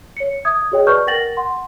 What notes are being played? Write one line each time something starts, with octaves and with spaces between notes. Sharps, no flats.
C#5 C#7
E5 D#6 G#6
F#4 G#4 C#5 D#5 G5
B4 D5 A5 C#6 F6 G6
A#4 F#5 G5 A6 A#6 F#7
F#5 C6